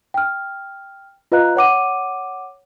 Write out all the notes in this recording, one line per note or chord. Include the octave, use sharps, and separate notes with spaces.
G5 F6
F4 B4 D#5 F5 A#5 F#6
C#5 F#5 D6 D#7